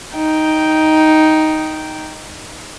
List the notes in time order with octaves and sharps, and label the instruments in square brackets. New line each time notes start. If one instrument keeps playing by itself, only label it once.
[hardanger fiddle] D#4 G5